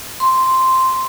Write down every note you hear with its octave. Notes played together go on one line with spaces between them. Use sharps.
C6